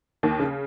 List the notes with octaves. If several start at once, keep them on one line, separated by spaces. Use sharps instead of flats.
D#2 D#3
C#3